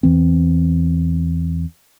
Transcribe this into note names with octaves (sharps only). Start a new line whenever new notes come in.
E2 E3 C4